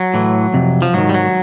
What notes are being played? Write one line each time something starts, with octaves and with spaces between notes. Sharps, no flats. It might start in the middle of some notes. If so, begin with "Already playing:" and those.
Already playing: F#3
A2 E3
F2 C3
F3
G#2 D#3 F#3
G3
F#3